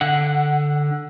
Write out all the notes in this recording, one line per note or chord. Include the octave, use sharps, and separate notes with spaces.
D3 F#5